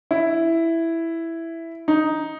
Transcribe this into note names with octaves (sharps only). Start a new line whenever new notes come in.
E4
D#4